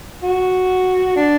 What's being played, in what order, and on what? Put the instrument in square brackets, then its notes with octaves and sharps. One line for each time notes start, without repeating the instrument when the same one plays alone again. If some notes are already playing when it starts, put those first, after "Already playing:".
[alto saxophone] F#4
D4